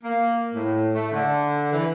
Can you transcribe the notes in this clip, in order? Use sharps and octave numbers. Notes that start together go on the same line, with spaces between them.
A#3
A2
A3
D3
E3